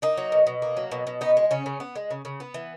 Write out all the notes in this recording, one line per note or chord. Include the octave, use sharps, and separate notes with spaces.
A#3 D#4
F#3
B2
B2
A#3
F#3
B2
B2
B3 D#4
G#3
C#3 C#4
C#3
B3
G#3
C#3
C#3
B3
E3